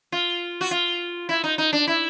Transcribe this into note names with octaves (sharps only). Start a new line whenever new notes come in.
F4
F#4
F4
E4
D#4
D#4
D4
E4